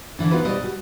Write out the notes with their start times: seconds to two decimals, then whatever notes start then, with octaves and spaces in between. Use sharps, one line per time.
0.19 D3 E3 D4
0.31 B3 D#4 F4 F#4 B4
0.44 B2 G3 B4 D5 D#5
0.62 G3 F#4